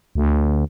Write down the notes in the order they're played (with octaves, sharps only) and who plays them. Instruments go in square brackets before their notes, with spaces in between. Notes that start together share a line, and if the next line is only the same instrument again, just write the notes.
[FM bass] D2